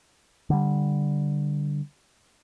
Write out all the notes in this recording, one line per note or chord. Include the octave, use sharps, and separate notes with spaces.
D3 G3